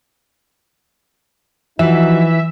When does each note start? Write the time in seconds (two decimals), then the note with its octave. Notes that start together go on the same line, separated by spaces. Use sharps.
1.79 E3 F3 D#4 F#4 E5